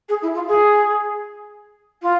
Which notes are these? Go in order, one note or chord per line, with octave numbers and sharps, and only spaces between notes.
G#4
E4
F4
G#4
F4